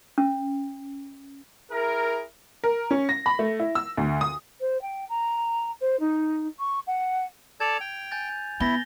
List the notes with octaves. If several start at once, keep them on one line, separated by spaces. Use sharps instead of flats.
C#4
E4 G#4 A#4
A#4
C#4
A#6
B5
A3
E4
E6
D2
D#6
C5
G5
A#5
C5
D#4
C#6
F#5
A4 D5 A5 G#6 F7
G5
G#5 G6 A6
B3 E4 A6 A#6 G7